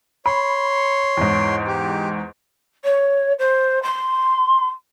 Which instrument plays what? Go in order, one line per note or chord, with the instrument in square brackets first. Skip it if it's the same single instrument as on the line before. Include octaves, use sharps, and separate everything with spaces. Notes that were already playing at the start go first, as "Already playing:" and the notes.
[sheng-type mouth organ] C#5 C6 [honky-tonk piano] B5
[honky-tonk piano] E2 G#2
[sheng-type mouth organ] G4
[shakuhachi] C#5
C5
C6